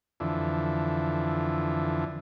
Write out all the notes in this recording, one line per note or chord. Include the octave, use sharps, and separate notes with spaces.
F2 D3 E3